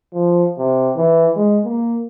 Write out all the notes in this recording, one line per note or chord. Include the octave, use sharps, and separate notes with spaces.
F3
C3
E3
G#3
A#3